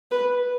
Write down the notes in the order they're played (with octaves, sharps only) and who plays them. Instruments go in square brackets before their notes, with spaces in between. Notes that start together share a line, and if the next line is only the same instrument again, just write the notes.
[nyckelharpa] B4